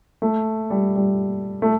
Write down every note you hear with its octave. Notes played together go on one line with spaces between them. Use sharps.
A3
G3
G3
A3